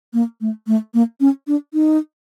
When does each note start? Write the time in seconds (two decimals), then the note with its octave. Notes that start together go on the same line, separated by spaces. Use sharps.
0.13 A#3
0.41 A3
0.67 A3
0.94 A#3
1.21 C#4
1.47 D4
1.74 D#4